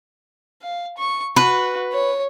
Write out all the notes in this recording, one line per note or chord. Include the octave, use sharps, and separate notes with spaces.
F5
C#6
F#4 B4
C#5